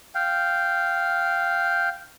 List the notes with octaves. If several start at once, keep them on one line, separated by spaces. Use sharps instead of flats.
F5 G5